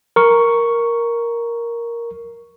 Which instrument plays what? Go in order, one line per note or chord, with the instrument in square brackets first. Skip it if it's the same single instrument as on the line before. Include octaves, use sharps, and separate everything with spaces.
[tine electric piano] A#4 C#6